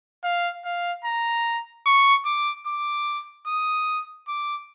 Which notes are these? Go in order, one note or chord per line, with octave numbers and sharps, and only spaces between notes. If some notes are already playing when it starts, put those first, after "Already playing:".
F5
F5
A#5
C#6
D6
D6
D#6
D6